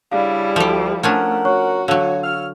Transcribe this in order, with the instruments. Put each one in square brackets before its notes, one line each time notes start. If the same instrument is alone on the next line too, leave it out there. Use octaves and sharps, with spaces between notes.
[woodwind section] C#3 D4 [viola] G3 E4 [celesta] F5
[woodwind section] D2 [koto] F3 G4
[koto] F3 C#4 D4 [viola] A3 [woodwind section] A#4 F#5
[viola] F#4 [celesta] C#5 C#6 F#6
[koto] D3 F#3 [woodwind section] C#5 [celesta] F5
[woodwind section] C#5 E6 F6